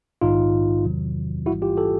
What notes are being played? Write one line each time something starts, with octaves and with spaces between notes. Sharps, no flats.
A#1 G#2 D#3 D#4 F4
E2 C3 D#3 F#3
A1 G#2 E3 G3 E4 F#4
F4 G4
G4 A4